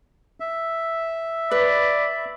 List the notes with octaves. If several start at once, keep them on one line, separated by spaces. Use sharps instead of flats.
E5
B4 D5 B5